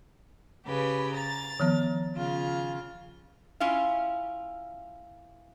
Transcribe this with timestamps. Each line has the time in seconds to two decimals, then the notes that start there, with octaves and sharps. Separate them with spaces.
0.65 C#3 G4 B4
1.15 A#5 A6
1.60 D#3 F3 B3
2.14 C#3 F4
3.60 C#4 E4 F4 F5